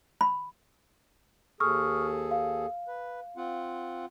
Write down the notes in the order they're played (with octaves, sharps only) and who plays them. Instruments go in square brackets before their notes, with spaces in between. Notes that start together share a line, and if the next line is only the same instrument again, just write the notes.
[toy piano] B5
[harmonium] D#2 G#4 A4 [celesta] C#6 D#6 F6
[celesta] F5
[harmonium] B4
C4 F4 F#5